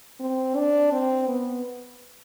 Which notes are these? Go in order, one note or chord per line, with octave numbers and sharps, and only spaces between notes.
C4
D4
C4
B3